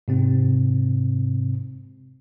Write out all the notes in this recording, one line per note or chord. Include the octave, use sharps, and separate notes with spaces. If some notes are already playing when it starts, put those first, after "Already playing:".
G#2 C3 C4